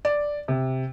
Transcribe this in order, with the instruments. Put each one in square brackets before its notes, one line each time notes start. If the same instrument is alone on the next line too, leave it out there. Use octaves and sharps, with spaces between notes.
[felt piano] D5
C3